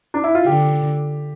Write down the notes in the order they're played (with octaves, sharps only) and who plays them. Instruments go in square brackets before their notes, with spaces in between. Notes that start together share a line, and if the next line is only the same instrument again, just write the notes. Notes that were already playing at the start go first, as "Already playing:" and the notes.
[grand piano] D4
E4
F4
[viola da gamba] D3 [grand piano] G4